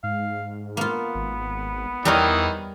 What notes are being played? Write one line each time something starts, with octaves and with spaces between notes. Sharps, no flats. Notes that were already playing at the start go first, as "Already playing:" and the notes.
G#2 F5
A#3 B3 F4
G#1
E2 D#3 E3 G3 D#4 A#4 C#5